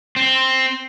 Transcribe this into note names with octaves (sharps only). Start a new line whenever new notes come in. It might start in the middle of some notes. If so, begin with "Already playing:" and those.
C4